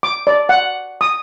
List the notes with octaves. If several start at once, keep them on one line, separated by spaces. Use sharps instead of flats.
D6
D5
F#5
D#6